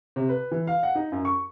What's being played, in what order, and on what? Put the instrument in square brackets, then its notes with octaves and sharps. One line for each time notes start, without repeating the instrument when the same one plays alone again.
[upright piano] C3
B4
E3
F5
F#5
D#4
F#2
C#6